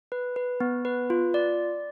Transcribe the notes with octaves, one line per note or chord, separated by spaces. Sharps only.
B4
B4
B3
B4
F4
D5